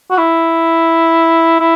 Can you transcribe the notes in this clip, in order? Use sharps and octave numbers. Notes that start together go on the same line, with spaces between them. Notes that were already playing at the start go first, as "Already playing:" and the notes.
F#4
E4
E4